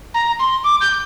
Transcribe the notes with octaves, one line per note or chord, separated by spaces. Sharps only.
A#5
C6
D6
G6